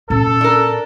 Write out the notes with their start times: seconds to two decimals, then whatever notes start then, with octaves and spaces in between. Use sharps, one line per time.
0.10 A#2 C#4 A4
0.41 D4 A#4